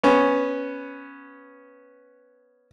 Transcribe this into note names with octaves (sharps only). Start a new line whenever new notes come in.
B3 C#4